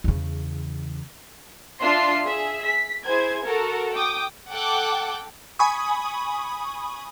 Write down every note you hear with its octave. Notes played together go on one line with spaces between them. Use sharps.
E2 C#3
D4 F4 E5 C6 C7
G#4 E5
B6
E4 G#4 C5 G#6
F#4 A4 A#4
G5 D6 D#6
A4 F#5 G5 D6
G#5 B5 C#6 D#6